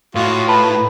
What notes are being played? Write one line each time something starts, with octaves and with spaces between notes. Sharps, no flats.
A2 F4 F#4 A4 D#5
B4 F5 A5 B5
E4